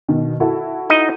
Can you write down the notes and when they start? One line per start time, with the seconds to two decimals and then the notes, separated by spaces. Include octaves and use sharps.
0.08 B2 D#3
0.40 E4 F#4 A4
0.90 D#4 D#5